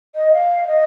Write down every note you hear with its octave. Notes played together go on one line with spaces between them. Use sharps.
D#5
F5
D#5